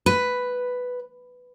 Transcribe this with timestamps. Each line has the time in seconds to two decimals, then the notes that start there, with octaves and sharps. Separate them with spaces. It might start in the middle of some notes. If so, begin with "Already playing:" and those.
0.06 B4